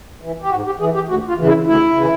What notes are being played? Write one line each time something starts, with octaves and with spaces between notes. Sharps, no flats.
E3
G4
G#2 F#4
G4
E3 G#4
G4
D2 F#4
F4
C#3 E3
E4
D2 E4
C#3 E3